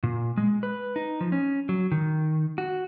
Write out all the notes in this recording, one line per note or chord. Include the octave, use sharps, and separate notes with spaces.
A#2
G#3
B4
D#4
F3
C#4
F#3
D#3
F#4